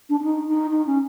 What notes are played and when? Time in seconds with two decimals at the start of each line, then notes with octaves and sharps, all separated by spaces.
0.10 D4
0.20 D4
0.24 D#4
0.48 D#4
0.71 D#4
0.87 C#4